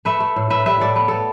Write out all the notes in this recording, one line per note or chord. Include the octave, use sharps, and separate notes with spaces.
A3 B4 E5
A3
A2
A2 B4 E5
G3 B4 E5
A2 A4 D5
B3 B4
B3 A4